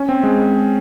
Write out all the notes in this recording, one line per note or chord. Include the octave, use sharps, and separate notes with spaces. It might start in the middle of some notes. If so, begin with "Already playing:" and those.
Already playing: C#4
C4
G#3